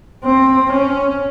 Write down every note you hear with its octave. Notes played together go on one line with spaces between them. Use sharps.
C4
C#4